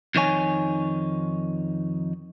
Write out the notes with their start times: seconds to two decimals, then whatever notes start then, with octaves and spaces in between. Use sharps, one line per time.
0.15 F2 D#3 D#4 C#5 G#5